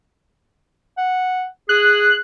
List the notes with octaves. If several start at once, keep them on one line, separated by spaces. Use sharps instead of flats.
F#5
G#4 F#6